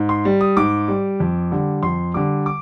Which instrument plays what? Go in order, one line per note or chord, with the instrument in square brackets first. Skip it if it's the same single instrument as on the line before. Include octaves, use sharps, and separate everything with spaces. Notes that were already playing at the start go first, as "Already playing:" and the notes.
Already playing: [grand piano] G#2
C6
G3
D#6
G#2 D6
G3
F2
D3 G3
F2 C6
D3 G3 D6
D6